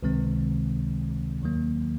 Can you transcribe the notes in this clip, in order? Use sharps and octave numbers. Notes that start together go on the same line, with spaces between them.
C#2 C3 D#3 G#3 C4
D#2 D#3 F#3 A#3